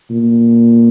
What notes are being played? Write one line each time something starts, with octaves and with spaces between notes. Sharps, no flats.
A#2